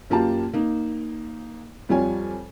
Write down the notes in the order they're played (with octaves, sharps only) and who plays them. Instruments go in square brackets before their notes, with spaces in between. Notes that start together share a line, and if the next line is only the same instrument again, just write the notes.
[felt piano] F#2 A#3 F4 G4 A5
A#3 D#4
F2 G3 F4 C#5 G#5